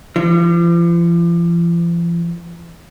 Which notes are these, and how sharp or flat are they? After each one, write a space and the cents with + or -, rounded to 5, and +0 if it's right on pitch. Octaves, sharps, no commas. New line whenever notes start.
F3 -45